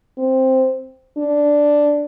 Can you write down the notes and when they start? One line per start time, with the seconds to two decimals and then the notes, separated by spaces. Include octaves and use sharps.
0.18 C4
1.18 D4